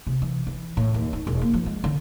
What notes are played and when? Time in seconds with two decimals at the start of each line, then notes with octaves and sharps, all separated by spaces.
0.07 C3
0.22 E3
0.47 E3
0.77 A2
0.94 D#2
1.13 D#4
1.27 E1
1.41 A#3
1.54 F3
1.66 G#3
1.84 D3